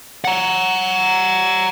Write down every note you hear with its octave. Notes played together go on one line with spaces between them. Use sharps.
F#5 A#5